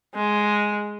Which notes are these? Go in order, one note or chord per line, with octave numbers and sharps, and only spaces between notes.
G#3